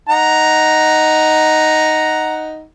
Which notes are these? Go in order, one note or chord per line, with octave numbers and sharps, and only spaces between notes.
D#4 F#5 A#5